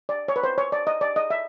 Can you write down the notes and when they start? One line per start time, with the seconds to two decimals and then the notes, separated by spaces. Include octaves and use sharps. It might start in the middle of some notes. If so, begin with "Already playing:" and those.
0.09 D5
0.28 C#5
0.36 B4
0.43 C5
0.58 C#5
0.72 D5
0.87 D#5
1.01 D5
1.16 D#5
1.30 E5